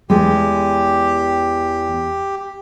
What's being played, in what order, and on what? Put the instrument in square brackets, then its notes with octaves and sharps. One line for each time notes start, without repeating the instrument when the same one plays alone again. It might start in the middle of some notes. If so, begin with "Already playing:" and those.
[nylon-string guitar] E2 G#3 [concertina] G4